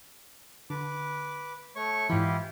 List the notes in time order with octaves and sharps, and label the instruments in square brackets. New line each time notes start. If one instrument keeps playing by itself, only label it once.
[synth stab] D3 [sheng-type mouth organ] B4 D6
[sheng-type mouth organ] A3 C#5 C#6
[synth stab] G#2 E3 [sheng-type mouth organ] E4 F4 G4